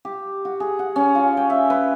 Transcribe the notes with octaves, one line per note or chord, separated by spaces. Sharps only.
G4
F#4
G#4
F#5
C#4
F4
G5
E5
B4